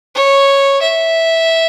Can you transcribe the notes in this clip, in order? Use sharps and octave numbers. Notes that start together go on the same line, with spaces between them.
C#5
E5